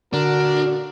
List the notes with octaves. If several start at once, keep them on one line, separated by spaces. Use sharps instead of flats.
A#2 D3 D4 F#4 A#4